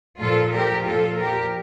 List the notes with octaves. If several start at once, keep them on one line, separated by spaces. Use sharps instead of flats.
A#2 F3 F4 A4
G4 A#4
A#2 F3 F4 A4
G4 A#4